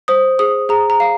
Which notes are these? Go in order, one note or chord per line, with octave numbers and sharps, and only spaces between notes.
C5 D#6
G#4 D#6
G#4 A#5
A#5
F5